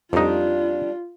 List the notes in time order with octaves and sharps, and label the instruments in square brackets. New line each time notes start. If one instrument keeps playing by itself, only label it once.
[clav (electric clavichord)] F2 D#4 [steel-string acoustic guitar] G3 D4 [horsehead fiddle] F4